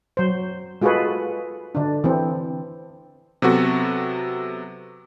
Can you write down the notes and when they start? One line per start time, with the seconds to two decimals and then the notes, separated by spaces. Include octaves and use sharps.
0.17 F#3 C5
0.81 G#3 F4 F#4 G#4 A4 B4
1.75 D3 D4
2.04 E3 C4
3.42 C3 F#3 B3 F#4 A4